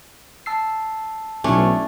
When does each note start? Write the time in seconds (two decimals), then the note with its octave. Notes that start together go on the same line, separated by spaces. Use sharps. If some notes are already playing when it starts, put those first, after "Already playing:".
0.46 A5 E6 C7
1.44 B1 A3 C#4 D4 E4